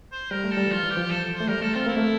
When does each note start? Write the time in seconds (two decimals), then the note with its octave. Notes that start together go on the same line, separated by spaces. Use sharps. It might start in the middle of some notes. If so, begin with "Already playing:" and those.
0.12 C5
0.31 G3 A#4
0.44 A3
0.51 A4
0.57 G3
0.66 E3
0.71 F3 F4
0.84 E3
0.90 G4
0.97 F3
1.10 A4
1.35 C5
1.40 A3
1.48 G3 A#4
1.61 A3 A4
1.74 C4 F4
1.87 A#3 E4
1.97 A3